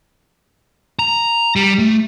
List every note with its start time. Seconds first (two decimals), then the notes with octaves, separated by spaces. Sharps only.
0.99 A#5
1.56 G3
1.79 A3